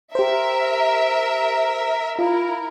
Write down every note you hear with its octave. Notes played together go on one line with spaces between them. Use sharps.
G4 A#4 C5 E5
E4 F4 A#4